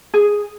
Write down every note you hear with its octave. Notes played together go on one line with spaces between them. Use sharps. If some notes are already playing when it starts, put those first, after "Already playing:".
G#4